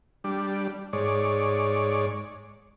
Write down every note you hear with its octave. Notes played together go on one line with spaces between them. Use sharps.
G3 D4
G#2 C#5 D5